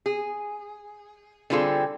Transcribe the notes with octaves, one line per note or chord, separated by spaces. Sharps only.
G#4
D3 G3 C4 F4 G#4 A4